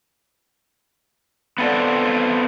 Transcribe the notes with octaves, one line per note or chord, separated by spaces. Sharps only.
B3 C4 F4 A4 D5 F#5